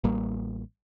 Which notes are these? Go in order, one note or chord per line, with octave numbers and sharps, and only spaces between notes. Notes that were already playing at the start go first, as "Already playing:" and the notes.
A1 G3 A#3